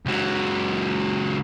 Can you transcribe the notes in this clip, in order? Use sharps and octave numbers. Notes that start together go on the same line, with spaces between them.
C#2 F#3